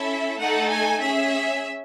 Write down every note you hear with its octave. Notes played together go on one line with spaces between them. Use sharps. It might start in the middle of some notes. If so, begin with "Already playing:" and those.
Already playing: C#4 E4 A4 E5
A3 D#4 A4 F#5
G#5
C#4 G#4 E5